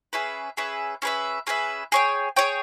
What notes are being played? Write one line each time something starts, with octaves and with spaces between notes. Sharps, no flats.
C#4 G#4 B4 E5
C#4 G#4 B4 E5
C#4 G#4 B4 E5
C#4 G#4 B4 E5
G#4 C#5 G5
G#4 C#5 G5